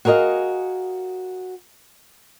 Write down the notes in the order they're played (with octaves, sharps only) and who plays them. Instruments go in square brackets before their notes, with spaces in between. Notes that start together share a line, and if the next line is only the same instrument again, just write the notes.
[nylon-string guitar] F#4 G#4 A#4 C#5 D#5 F5